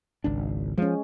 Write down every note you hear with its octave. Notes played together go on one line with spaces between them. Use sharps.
G#1 C#2 D4
F3 G#3 C#4